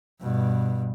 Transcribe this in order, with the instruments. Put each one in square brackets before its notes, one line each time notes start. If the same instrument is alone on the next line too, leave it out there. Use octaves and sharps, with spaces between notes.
[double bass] G2 B2